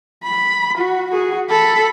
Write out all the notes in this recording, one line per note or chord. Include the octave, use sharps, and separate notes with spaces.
B5
F#4
F#4 G#4
A4 B5